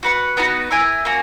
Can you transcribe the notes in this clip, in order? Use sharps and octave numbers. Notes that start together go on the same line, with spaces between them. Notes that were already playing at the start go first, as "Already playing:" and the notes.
F#4 B4 F#5
B3 D#4 F#4 B4
E4 A#4 E5 G#5
A#3 C#4 F#4